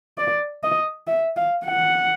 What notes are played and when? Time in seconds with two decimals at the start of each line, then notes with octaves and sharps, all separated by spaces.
0.18 D5
0.63 D#5
1.07 E5
1.36 F5
1.66 F#5